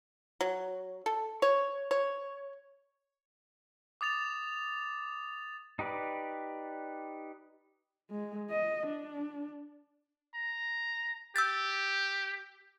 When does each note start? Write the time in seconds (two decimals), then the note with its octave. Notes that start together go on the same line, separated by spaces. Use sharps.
0.41 F#3
1.06 A4
1.42 C#5
1.91 C#5
4.01 D6 D#6 A6 F7
5.79 D#4 G4 B4 D5
8.10 G#3
8.51 D#5
8.87 D4
10.34 A#5
11.36 G4 E6 G6 A6